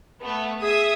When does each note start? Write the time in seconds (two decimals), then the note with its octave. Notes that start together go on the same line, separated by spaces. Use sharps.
0.21 A3 B3
0.61 G#4 E5 D#6